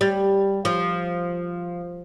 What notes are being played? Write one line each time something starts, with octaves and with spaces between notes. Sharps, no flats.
G3
F3